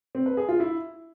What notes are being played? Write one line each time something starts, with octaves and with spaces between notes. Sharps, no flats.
C4
B4
G#4
F4
E4